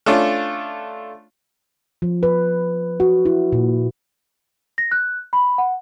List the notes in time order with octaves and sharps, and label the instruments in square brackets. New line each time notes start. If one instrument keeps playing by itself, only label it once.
[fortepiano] A3 C#4 D4 F4
[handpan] F3
B4
F#4
E4
A#2
[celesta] A#6
F#6
B5
F#5